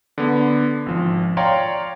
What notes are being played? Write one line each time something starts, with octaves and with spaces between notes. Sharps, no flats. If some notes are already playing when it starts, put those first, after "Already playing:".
D3 B3
G#1 F3
C#5 D5 F5 G5 A#5 C6